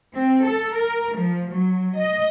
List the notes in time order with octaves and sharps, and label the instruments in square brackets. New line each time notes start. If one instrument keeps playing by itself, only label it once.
[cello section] C4
A4
A#4
F3
F#3
D#5